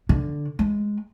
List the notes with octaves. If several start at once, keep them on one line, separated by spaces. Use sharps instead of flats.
D3
G#3